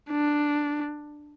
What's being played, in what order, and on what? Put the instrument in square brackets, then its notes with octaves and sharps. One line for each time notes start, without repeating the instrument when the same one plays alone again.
[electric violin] D4